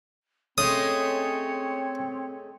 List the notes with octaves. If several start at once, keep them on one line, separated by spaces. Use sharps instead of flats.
G#3 A3 C4 C#4 C#5 D#6